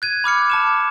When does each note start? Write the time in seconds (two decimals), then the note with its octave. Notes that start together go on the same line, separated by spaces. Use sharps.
0.02 F#6 G#6 D#7
0.24 B5 D6 F6 C#7
0.50 A5 D6 E7